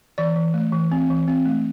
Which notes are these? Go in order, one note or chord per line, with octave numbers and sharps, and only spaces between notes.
E3 D5
E3
A3
E3
C4
E3
C4
A3